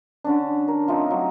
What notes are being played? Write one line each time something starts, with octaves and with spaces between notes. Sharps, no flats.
D3 C#4 D4
A#4
F3 A3 C4 D#4
F#3